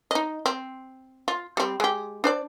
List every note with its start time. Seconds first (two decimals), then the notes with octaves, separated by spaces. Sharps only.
0.11 D#4 D#5
0.46 C4
1.28 F4
1.57 G3 C4
1.80 G#3 G4
2.24 D4 C5 D5